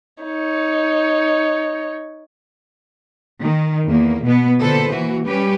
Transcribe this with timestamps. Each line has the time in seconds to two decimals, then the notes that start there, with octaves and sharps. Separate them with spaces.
0.23 D#4 C#5
3.41 D#3
3.87 E2 A#3
4.24 B2 B3
4.61 A#2 D3 A4 B4 C5
4.90 E3 A#3 F#4
5.25 G3 C#4 G4 B4